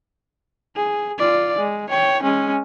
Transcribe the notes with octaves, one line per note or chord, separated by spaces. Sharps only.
G#4
F4 D5
G#3
C#5 G5
G#3 C#4